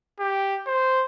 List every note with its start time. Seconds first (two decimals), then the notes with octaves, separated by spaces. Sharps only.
0.19 G4
0.67 C5